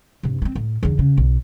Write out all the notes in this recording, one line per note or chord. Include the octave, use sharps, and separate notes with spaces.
G2 C3
B3 C4
A2
E2 D3
C#3
B1